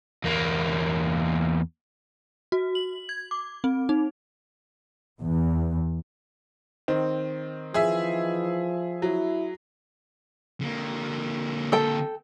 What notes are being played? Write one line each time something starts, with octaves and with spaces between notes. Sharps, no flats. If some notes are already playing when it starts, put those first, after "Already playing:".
E2 A#3
F#4
F#7
G#6
D6
C4
D#4
E2
D#3 C4
E3 F3 G#4 E5
F#3 E4
D3 A#3
A4 G5